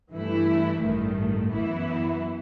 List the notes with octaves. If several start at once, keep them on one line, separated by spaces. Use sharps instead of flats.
G2 E3 A3 E4
A1 G2 D#3 A3
F#2 E3 B3 E4